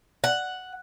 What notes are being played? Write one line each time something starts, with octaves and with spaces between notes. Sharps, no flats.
F#5